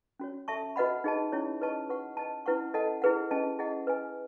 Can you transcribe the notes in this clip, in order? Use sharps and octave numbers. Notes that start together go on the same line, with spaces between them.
C#4 F#4 C#5
A4 E5 A5 C#6
F#4 B4 D#5 F#5 B5
D#4 G#4 D#5 A5
C#4 E4 G#4 C#5
G#4 B4 D#5 A5 C#6
F#4 B4 F#5 C#6
B4 D#5 A5
C#4 E4 B4 F#5 C#6
A4 D#5 F#5 A5
E4 G#4 B4 F#5
C#4 G#4 D#5 A5
E4 G#4 D#5 F#5
B4 D#5 G#5